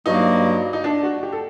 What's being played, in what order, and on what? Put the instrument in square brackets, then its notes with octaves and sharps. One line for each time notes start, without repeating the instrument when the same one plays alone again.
[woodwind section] G2 F#3 A#3 F#4 [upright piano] D#4
[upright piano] D#4
D4
F#4
G4
A4